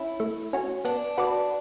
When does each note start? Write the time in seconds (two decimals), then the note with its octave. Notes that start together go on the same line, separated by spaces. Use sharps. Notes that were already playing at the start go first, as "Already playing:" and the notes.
Already playing: C#4 E4
0.20 A3
0.53 C#4 F#4
0.85 B3 D4
1.18 F#4 B4 D5